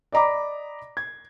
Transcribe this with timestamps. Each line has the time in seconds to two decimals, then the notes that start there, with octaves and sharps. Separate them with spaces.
0.12 D5 D#5 A#5 B5 D6
0.97 G#6